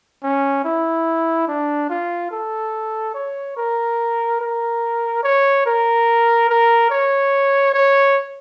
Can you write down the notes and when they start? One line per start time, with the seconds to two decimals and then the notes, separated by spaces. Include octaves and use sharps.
0.24 C#4
0.65 E4
1.48 D4
1.90 F4
2.31 A4
3.15 C#5
3.57 A#4
4.41 A#4
5.24 C#5
5.66 A#4
6.49 A#4
6.91 C#5
7.74 C#5